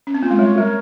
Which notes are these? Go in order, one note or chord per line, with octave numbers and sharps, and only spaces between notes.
C#4
C4
A#3 F4
G#3
G3 C#5
G3 A#4